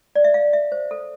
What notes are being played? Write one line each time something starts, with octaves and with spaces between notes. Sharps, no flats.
D5
E5
F5
E5
C5
A4